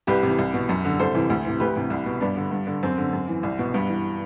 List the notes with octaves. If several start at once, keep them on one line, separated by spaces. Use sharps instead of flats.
C2 G4 B4
C3 E3
C2
B2
F#2
D3
C2 A4 C5
C3 E3
D2
C3 E3
D2 G4 B4
C3 E3
C2
B2
G2 B3 D4
D3
G2
D3
F#2 C4
D3
F#2
E3
C2
B2
G2 B3
E3